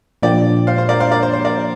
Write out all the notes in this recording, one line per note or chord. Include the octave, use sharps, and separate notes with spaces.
A#2 F3 A#3 D4 D5 G5
C5 F5
C5
A#4 D5
C5 F5
A#4 D5
C5
C5
A#4 D5